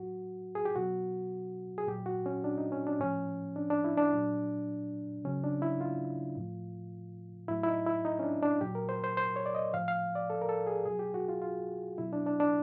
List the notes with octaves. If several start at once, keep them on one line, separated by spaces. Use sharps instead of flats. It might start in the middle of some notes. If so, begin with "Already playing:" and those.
Already playing: A2 F#3 F#4
G#4
G4
B2 F#3 F#4
G#4
A#2 F#3 G4
F#4
C#4
D4
D#4
C#4
D4
A2 F3 C#4
D4
D4
E4
D4
A#2 F#3
C#3 F#3 C#4
D4
E4
F4
A2 F3
A2 F#3 E4
E4
D#4
E4
D#4
C#4
D4
D4
A#2 F#3 G4
A#4
C5
C5
C5
C#5
D5
D#5
A2 F3 F5
F5
D5
A4
A#4
A4
G#4
B2 F#3 G#4
G4
F#4
F4
F4
B2 F#3 E4
D4
D4
D4